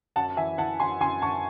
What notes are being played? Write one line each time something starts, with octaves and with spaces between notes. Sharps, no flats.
F#2 F#5 A5
E3 E5 G#5
E3 F#5 A5
F#2 G#5 C6
F#2 G#5 C6
F#2 A5 C#6